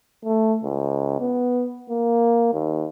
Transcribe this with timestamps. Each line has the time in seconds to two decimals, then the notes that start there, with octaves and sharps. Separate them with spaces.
0.25 A3
0.64 C#2
1.20 B3
1.90 A#3
2.53 D#2